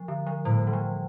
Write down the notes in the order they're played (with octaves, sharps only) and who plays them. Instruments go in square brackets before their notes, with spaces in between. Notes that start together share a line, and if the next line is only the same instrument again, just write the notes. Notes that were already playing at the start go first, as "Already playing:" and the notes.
Already playing: [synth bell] F3
D3
F3
[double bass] A2 [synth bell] G3
[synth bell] E3
F3